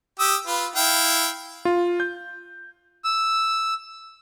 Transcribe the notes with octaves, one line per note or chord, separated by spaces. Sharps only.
G4 D#6 E6
F4 B4
E4 F5 G5
F4
G6
E6